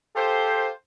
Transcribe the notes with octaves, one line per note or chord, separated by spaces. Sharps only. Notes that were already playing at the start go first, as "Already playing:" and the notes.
F4 G4 A4 C5